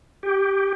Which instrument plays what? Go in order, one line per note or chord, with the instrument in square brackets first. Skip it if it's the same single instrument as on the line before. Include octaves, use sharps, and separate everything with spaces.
[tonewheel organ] G4